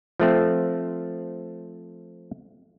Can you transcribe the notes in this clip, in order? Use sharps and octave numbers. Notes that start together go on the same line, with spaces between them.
F3 A3 C4